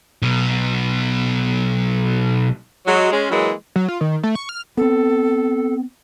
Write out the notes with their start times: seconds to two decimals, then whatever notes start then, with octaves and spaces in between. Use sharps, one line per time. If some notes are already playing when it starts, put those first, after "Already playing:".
0.22 B1 B2
2.87 F#3 G#3
3.12 G#3 C#4
3.30 E3 F#3 G#3 A#3
3.76 F#3
3.88 F4
4.01 D#3
4.23 A3
4.35 C#6
4.49 F6
4.77 B3 C4 A4